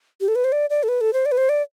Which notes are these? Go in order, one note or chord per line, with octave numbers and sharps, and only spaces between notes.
G4
A4
B4
C5
D5
D5
A4
B4
A4
C5
D5
B4
C5
D5